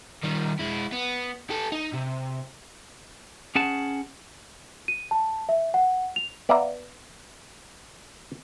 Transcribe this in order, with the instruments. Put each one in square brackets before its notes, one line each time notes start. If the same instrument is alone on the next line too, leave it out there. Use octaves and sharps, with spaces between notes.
[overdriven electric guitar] D#3 G3
G#3 E4
B3
G4 A4
D#4
C3
[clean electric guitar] C#4 G#4 F#5 A5
[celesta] D#7
A5
E5
F#5
F7
[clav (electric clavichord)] B3 D5 E5 F5 A#5